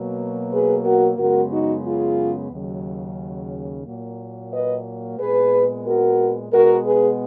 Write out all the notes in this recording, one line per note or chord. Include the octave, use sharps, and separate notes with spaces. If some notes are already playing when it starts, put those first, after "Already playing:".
Already playing: B2 F#3 A#3
G#4 B4
F#4 A#4
F#2 C#3 G#3 B3 F#4 A#4
D#4 F#4
F4 G#4
D#2 C#3 F#3
A#2 F#3 A#3
B4 D#5
A#2 G#3 B3 G#4 B4
F#4 A#4
B2 G#3 B3 F#4 A#4
G#4 B4